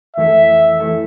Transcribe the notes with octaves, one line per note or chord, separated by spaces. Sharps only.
F2 E3 A3 E4 A4 E5
E3 A3 E4 A4